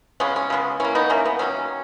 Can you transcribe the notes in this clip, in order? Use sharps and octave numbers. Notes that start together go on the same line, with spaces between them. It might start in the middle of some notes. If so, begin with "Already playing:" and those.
C#3 G#3 B3 C#4
C#4
C#3 G#3 B3
E3 A#3 C#4
B3 D#4
E3 A#3 C#4
B3
D#3 F#3 A#3 C#4